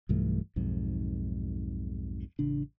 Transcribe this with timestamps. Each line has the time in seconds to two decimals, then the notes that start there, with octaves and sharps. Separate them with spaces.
0.09 B1 G2 E3 A3
0.56 B1 F2 G#2
2.39 A1 C#3 D4